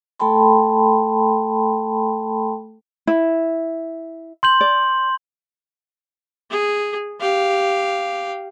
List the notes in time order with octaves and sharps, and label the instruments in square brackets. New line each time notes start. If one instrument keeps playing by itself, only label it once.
[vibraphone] A3 A4 G5 A5 B5 C6
[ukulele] E4
[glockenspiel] C6 G6 F#7
[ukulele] D5
[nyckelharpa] G#4
G4 F5